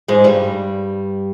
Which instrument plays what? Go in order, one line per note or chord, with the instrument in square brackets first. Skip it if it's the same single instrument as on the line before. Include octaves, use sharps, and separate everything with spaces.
[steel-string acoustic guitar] G#2 G#3
G2 G3